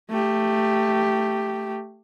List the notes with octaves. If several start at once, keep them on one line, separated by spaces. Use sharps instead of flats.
A3 G4